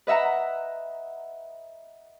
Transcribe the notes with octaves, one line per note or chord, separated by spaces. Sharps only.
B4 D#5 E5 F#5 A#5